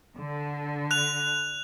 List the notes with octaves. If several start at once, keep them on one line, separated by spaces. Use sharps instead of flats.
D3
F#6 F7